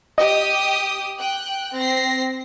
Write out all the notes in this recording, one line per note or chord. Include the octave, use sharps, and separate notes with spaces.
G4 D#5 D#6
G5 F#6
C4 A#6 C7